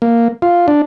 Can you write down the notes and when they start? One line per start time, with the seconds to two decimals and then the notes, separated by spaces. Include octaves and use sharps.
0.02 A#3
0.42 F4
0.68 D4